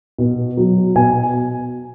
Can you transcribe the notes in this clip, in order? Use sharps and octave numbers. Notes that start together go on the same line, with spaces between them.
B2
F#3
B2 G#5